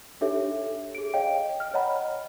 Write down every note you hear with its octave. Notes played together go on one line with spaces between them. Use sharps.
D4 D#4 G4 A4 C#5 E5
G#4 D7
C#5 D#5 F5 G5
F6
C#5 D#5 F#5 A#5 B5